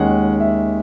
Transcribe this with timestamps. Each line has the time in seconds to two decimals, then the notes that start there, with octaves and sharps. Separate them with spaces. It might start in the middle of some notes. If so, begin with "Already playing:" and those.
Already playing: D#2 D#3 G#3 C#4 F#5
0.40 E5